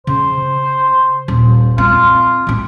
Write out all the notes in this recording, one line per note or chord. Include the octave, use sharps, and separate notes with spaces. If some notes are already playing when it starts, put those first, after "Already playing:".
C#3 C5
D#1
C4 F4
A1 C4